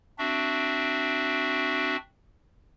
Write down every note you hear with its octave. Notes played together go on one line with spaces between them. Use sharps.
C4 D4 F#4 E5